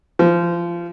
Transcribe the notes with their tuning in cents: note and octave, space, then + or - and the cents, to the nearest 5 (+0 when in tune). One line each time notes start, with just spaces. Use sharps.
F3 -25